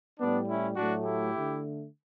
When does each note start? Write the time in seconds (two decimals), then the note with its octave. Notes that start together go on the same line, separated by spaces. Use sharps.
0.20 A2 G3 B3 D4
0.48 C#4 E4
0.76 A2 F#3 A3 D4 F#4
1.04 E4 G4
1.33 D3 A3